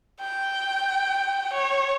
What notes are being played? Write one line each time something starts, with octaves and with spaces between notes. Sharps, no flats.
G5
C#5